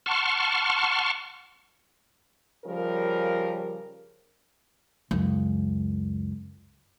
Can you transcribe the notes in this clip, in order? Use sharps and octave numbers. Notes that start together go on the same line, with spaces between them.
F#5 A5 C6 C#6 F6
C#3 F3 G3 A#4
C#2 F#2